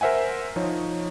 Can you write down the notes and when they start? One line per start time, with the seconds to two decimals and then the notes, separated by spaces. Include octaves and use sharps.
0.01 A#4 C5 E5 F#5 G#5
0.56 F3 D#4 C#5